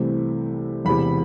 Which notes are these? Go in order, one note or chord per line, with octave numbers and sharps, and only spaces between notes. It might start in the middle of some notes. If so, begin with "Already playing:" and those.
Already playing: C2 C3 E3 A3 C4
E1 E2 C3 B5